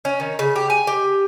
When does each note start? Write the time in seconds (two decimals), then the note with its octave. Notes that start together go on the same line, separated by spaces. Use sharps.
0.05 C#4
0.20 D#3
0.39 C#3
0.56 G4
0.70 G#5
0.87 G4